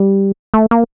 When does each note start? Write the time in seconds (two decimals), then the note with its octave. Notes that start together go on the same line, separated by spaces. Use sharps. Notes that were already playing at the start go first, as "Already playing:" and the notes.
Already playing: G3
0.54 A3
0.71 A#3